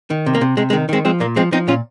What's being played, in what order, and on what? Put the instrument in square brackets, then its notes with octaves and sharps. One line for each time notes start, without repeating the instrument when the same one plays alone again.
[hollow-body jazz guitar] D#3
C3
A#3
C3
C3 G#3
G#3
D#3
D#3 G#3 C4
F3 G#3 C4
A#2 A#3
F3 G#3 C4
F3 C4 D#4
A#2 C#4 F4